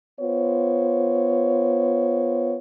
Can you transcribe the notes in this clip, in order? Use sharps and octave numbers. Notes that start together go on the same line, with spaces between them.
B3 F4 C5 C#5